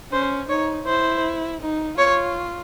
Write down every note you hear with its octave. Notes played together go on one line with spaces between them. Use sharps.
C#4 C5
D#4 C#5
E4 C5
D#4
F4 C#5